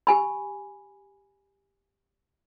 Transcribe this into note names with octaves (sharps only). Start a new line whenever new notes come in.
G4 G#5 B5